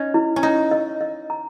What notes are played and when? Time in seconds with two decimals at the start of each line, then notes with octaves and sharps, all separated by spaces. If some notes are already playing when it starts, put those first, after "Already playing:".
Already playing: C#4 D#4
0.14 E4
0.36 C#4
0.43 D#4 A#5
0.71 D#5
1.01 D#5
1.30 A#5